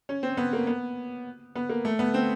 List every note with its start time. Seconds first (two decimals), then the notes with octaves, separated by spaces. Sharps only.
0.09 C#4
0.23 C4
0.37 B3
0.53 A#3
0.67 B3
1.56 B3
1.69 A#3
1.85 A3
1.99 B3
2.14 C4